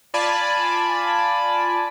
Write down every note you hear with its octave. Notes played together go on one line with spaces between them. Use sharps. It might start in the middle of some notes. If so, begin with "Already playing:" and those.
F4 D5 G#5 A5 B5